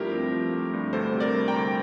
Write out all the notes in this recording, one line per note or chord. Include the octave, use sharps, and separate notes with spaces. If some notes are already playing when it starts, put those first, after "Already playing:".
Already playing: G2 F3 A3 C4 E4 F4 G4 A#4
C4
F3
A3
G2
D2 A4 C5
C3
A#4 D5
G3
G5 A#5
D2